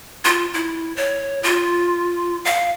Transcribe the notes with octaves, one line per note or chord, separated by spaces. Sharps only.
F4
E4
C#5
F4
F5